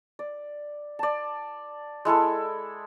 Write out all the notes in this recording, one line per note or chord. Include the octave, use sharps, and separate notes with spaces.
D5
D5 A5
G#3 E4 A4 A5